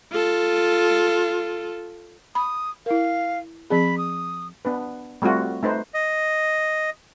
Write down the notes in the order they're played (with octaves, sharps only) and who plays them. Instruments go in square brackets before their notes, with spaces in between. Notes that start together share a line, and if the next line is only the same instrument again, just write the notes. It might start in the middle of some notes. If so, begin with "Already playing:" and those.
[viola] F4 A4
[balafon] B5 [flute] D#6
[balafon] E4 A#4 [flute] F5
[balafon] F3 C4 G#4 [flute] B5
[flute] D#6
[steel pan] B3 D4 B4
G3 A3 C4 F4 F#4
A3 D#4 B4 C5
[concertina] D#5